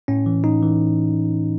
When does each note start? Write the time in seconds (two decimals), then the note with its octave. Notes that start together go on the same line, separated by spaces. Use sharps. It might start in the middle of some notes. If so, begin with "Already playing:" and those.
0.08 A2 C#4
0.26 E3
0.44 A2 D#4
0.62 E3